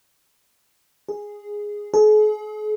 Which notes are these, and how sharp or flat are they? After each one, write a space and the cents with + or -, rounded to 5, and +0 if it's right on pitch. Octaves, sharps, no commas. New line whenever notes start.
G#4 -5
G#4 +45